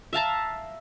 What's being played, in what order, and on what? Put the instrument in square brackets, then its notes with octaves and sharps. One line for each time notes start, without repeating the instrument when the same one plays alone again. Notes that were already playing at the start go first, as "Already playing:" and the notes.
[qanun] E5 F5 A5 A#5